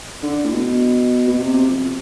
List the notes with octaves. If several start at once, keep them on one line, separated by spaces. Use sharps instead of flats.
D3
A2
B2
B2
C3
C3
F2